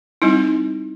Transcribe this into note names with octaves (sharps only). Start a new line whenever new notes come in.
G3 C4 D#4 E4